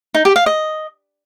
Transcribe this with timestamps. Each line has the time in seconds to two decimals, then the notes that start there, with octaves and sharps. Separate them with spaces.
0.14 D#4
0.25 G4
0.36 F5
0.46 D#5